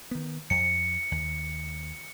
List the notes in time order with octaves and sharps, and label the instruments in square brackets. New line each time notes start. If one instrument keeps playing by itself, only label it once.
[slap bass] D#3 B3
[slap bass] F2 [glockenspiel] C#7
[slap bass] D#2